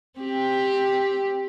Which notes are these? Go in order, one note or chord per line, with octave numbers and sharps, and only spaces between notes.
C4 G4